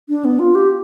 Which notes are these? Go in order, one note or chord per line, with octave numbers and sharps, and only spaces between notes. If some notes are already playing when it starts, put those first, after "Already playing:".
D4
B3
F4
G4